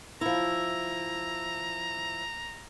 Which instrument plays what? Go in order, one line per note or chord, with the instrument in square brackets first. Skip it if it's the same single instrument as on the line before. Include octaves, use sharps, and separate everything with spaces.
[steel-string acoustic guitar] F3 E4 [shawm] A#5